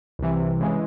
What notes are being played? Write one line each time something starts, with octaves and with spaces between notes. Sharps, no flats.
C2 C3 E3
C#3 E3 G#3